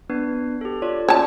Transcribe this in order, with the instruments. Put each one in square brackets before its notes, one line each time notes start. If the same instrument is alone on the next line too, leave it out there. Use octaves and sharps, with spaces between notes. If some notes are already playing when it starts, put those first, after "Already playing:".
[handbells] B3 D4 B4
G4 A4
F4 C#5 D5
[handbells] C#4 D5 [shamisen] C#5 A5